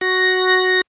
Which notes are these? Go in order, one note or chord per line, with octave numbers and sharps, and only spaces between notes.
F#4 A#6